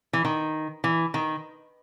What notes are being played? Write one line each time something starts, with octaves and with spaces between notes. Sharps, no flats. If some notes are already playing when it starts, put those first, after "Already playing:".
E3
D#3
E3
D#3